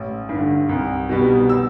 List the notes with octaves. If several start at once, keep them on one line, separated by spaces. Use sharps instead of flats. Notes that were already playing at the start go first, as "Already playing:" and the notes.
Already playing: A1
G2 D3
C2
B2 G3 B3
E6